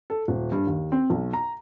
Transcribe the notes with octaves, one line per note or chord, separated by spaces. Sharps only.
A4
D#1
G2
D#2
C4
B1
A#5